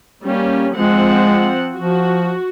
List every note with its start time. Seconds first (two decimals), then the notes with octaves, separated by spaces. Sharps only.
0.22 G3 A#3 C#4 G4
0.75 F3 G#3 C4 F#5
1.76 F3 F#4